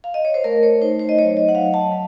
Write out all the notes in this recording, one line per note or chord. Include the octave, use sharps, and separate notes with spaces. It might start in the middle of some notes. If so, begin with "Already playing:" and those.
F5
D#5
C#5
C5
A3 A#4
C#5
D#4 C5
C5
D#5
F#3 C#5
D#5
F#5
F#3 F5
A5
F#3